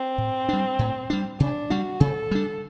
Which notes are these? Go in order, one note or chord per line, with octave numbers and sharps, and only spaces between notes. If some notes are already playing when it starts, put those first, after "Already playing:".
Already playing: C4
A2
G3 D4
A2
G3 D4
C3 D4
G3 D4 F#4
C3 A4
G3 D4